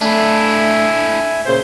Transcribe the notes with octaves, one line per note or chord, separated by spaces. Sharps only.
A3 D4 E4 E5 G#5
A#2 C#3 C5